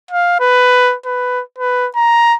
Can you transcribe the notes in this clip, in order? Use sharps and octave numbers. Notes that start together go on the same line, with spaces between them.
F5
B4
B4
B4
A#5